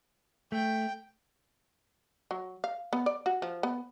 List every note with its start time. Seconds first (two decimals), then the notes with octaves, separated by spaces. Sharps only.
0.52 A3 G5
2.31 F#3
2.64 F5
2.93 B3
3.06 D5
3.26 F#4
3.42 F3
3.63 B3